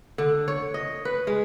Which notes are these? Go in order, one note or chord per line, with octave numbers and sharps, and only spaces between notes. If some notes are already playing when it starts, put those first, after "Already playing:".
D3
C#5
D#5
B4
G#3